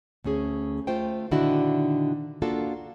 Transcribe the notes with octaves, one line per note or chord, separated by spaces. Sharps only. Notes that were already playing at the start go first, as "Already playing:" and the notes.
D2 A3 C#4 G#4
A3 F4 C5 G5
A#2 D3 D#3 D4 E4 F#4
A#3 D4 F4 F#4 A4